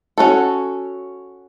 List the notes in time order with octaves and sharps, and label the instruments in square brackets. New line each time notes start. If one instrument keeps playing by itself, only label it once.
[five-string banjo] C#4 F#4 A4